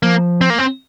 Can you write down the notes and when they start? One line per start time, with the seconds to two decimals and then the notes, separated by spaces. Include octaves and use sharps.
0.03 F3 A#3
0.41 C4
0.50 A#3
0.58 C4